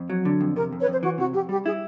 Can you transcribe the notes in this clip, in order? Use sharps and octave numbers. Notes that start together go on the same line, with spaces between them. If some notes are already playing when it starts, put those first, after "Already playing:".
Already playing: F2
F#3
D3
F2
C3 A#4
F2
B4 C#5
F2 C5
E3 F#4
C3 F#4
F2 G4
G3 G4
E4 G#4